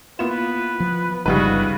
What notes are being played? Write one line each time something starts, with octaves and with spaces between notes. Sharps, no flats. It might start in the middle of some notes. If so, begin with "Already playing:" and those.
A#3 B3 E4 F4 B4 E7
F3
G1 C#2 C#3 F3 G3 D#4 F#4 B4